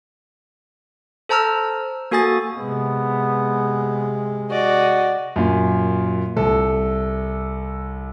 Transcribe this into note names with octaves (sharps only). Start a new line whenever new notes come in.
A4 C5 A5 A#5 E6 F6
A#3 F#4 A4 G#5 D#6 A6
C3 G#3 B3
F#4 D5 D#5
F#2 A#2
C2 A4